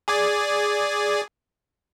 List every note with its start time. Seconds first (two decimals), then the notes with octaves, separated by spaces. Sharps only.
0.08 G#4 D5 G#5